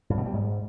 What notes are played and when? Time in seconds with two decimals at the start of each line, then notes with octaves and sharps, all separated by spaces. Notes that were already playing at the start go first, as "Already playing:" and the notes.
0.10 G2
0.18 B2
0.26 G3
0.34 G#2